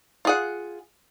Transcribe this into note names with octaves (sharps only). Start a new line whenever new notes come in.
F4 G#4 F#5